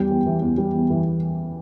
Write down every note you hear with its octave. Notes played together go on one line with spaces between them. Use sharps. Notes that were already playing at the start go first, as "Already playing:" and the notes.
Already playing: E2 G3 G5
E2
E3
E2
G3
E2
E3